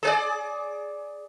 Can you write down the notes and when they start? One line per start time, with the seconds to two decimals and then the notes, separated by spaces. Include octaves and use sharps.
0.03 G#4 B4 D5